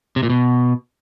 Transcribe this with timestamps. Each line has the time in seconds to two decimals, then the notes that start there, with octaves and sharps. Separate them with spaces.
0.16 C3
0.23 A#2
0.30 B2